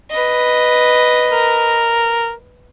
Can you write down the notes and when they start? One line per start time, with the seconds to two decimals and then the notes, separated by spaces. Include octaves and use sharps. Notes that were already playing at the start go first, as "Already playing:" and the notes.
0.11 B4 D#5
1.32 A#4